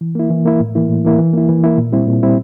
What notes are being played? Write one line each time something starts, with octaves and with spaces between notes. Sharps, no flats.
E3
A#3 E4
E3
A#3 E4
A2
E3 A#3 E4
A2
E3 A#3 E4
E3
A#3 E4
E3
A#3 E4
A#2
G3 C4 E4
A#2
G3 C4 E4